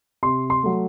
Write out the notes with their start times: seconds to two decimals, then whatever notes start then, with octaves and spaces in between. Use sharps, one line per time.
0.23 C3 C6
0.50 C6
0.63 F#3 A3